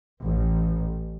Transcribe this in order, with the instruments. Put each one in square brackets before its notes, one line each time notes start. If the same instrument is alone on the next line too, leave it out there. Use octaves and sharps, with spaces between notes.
[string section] A1